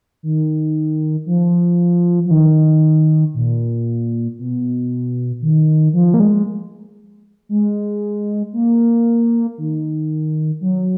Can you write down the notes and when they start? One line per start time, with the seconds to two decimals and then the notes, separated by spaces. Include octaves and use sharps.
0.23 D#3
1.26 F3
2.26 F3
2.31 D#3
3.34 A#2
4.39 B2
5.42 D#3
5.93 F3
6.14 A#3
6.20 G#3
7.49 G#3
8.53 A#3
9.58 D#3
10.61 F#3